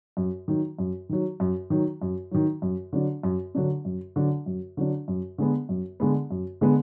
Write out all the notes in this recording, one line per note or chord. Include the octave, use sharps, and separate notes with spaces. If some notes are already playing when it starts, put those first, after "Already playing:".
F#2
D#3 F#3
F#2
D#3 F#3
F#2
D#3 F#3
F#2
D#3 F#3
F#2
D3 F#3 D4
F#2
D3 F#3 D4
F#2
D3 F#3 D4
F#2
D3 F#3 D4
F#2
D3 G#3 B3
F#2
D3 G#3 B3
F#2
D3 G#3 B3